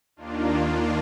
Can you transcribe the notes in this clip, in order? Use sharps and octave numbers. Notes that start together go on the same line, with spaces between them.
D#2 D#3 A#3 D4 F4